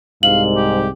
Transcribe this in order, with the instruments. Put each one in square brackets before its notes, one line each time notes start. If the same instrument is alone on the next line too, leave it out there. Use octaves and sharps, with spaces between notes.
[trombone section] C2 G#2 [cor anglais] F5 [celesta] F#7
[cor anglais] G4